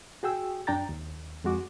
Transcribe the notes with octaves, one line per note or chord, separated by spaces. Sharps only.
F#4 G#4 G5 E6
F#2 D4 G5 A#5 A6
D#2
F2 G#3 F#4 D6